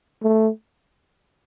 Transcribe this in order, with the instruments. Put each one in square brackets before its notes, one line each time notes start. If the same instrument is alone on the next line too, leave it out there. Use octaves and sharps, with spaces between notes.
[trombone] A3